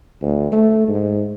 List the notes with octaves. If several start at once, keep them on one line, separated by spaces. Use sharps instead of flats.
D2
A3
G#2